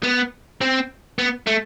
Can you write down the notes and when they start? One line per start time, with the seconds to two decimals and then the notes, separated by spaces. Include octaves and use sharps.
0.04 B3
0.61 C4
1.18 B3
1.47 A3